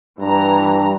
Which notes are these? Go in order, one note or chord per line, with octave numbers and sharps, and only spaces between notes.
G2 E3 A#5